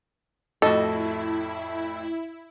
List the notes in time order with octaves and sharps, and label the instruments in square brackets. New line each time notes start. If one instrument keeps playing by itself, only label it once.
[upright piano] F2 A2 [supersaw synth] E4 [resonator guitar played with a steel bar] F#4 D#5 [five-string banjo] A4